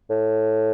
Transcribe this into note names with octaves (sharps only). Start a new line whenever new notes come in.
A2